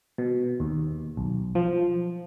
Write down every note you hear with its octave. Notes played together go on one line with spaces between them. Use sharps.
B2
D#2
B1
F3